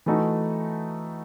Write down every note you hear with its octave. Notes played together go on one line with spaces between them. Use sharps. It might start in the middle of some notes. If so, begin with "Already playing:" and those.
E3 A3 D#4 F#4